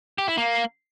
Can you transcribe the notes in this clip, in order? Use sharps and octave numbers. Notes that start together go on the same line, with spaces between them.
G4
E4
A#3